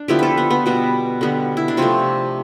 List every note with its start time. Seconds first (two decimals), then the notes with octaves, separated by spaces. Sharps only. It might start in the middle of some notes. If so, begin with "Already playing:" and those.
Already playing: D4
0.08 D3 F3 B3 E4 G4
0.19 F4 A4 B4
0.37 B3
0.50 B3
0.66 B2 G3 B3
1.21 D3 G3 B3
1.57 E4
1.68 D4
1.77 C3 F3 A3 C4